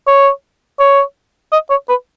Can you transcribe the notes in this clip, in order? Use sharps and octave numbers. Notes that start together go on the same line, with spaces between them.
C#5
C#5
D#5
C#5
B4